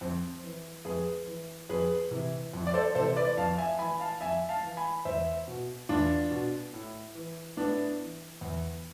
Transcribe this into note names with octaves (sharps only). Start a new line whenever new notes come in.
F2 C4
E3
F2 G#4 B4
E3
F2 G#4 B4
C3 E3
F2
D5
A4 C5
C3 E3 A4 C5
B4 D5
F2 F5 A5
E5 G#5
E3 G#5 B5
F5 A5
F2 E5 G#5
F5 A5
E3
G#5 B5
E2 C5 E5
B2
E2 D4 F4
B2
A2
E3
A2 B3 D4
E3
E2